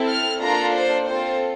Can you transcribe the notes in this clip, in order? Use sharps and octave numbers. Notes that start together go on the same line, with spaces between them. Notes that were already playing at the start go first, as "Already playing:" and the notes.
Already playing: C4 E4 A4
F6
A#3 D4 F4 A4 A#5
C5
C4 F4 A4 C5